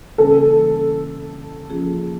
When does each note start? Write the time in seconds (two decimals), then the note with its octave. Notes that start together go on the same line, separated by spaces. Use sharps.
0.18 C#3 E3 G3 A#3 C#4 A4
1.70 F3 A#3 C#4 F4 G#4